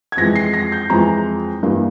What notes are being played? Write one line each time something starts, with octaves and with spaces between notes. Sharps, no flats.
G#6
F2 E3 G#3 A#6
C7
A#6
G6
F2 E3 G#3 A#5
G2 E3 A#3